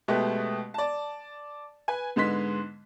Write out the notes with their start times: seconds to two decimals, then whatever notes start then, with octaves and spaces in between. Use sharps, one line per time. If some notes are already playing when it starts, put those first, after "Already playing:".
0.08 B2 G#3 A3 B3 G4
0.74 D5 A5
1.88 B4 G#5
2.16 G#2 D3 G#3 B3 C6 B6